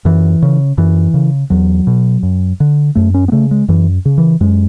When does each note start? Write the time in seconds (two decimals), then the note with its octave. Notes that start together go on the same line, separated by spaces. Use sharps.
0.05 F#2 E3
0.42 C#3
0.78 F#2 E3
1.14 C#3
1.50 E2 F#3
1.87 B2
2.23 F#2
2.60 D3
2.95 F#2 A3
3.14 C#4
3.28 B3
3.32 C#3 A3
3.51 G#3
3.68 F#2 E3
4.05 C#3
4.18 E3
4.41 F#2 G#3